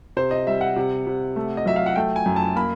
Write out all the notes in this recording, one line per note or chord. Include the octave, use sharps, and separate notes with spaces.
C3 C5
D#5
G3 E5
F#5
C3
C3
A3
D#5
F#3 E5
F5
F#5
A3 G5
G#5
F#2
A5
A#3 B5